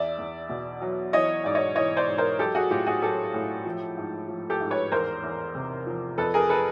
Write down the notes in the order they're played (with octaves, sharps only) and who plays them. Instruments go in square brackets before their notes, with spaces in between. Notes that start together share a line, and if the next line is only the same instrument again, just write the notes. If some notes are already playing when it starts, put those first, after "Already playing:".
Already playing: [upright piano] E2 D5 E5
E2
B2
F#3
E3 C#5 D#5
G#2 D5
C#5 D#5
E3 C#5 D#5
C5 D5
G#2
A#4 C5
F#3 G4 A4
F#4 G#4
A2 F4 G4
F#4 G#4
F#3 G4 A4
A2
F3
G#2
F3
G4 A4
G#2
B4 C#5
E2 A#4 C5
E2
C3
F3
F2 A4 B4
G#4 A#4
A4 B4